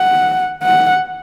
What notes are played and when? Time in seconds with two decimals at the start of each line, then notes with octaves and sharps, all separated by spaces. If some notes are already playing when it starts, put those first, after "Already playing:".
Already playing: F#5
0.63 F#5